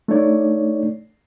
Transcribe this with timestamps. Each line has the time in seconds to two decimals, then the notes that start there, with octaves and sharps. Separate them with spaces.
0.08 A3 D4 D#4 C#5 D5